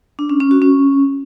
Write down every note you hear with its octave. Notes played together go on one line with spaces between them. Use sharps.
D4
C#4
C#4
F#4
C#4